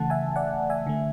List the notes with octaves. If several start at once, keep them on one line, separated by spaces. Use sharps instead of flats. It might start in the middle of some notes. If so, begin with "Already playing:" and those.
Already playing: C#3 E3 A3 F#5 A5
E5 G#5
D5 F#5
E5 G#5
D3 A3